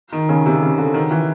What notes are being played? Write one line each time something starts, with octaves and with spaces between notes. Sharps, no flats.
D#3
C#3
C3
C#3
D3
D#3
E3